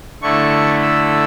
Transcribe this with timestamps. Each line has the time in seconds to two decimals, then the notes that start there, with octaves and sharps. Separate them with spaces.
0.22 D3 A3 E4 C#6
0.82 E6